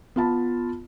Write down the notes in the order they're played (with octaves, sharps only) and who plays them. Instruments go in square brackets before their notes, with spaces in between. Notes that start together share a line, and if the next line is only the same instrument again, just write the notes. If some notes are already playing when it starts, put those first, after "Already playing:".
[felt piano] B3 F4 A5 B5